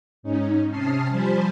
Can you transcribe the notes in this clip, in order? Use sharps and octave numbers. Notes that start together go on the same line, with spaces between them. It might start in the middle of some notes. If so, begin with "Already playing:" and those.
G#2 C#4 D#4
C3 C#4 A5 D#6 F6 C7
F3 G3 C5 G#5 A5 B5